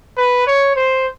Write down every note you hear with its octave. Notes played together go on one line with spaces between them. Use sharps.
B4
C#5
C5